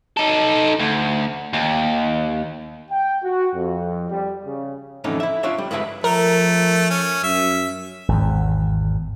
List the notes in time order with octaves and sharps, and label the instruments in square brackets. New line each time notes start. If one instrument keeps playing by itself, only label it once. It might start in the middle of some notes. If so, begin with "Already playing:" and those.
[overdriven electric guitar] D#4 A4
D2
D#2
[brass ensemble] G5
F#4
F2
G3
C#3
[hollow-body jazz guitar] F2 A2 D3 E3 C#4 D#4
E4 E5
D4 F4 C#5 E5
G3
G2 G#3 E4 B4 E5 F#5
[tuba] F3 [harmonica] A3 [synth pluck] A#4
[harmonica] C#4
[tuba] F#2 [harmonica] E5
[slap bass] G#1 E2